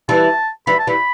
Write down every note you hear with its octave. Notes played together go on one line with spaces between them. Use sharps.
E3 G3 A5
E3 G3 B5
A5
E3 G3 B5